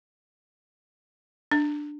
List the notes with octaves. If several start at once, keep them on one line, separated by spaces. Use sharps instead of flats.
D4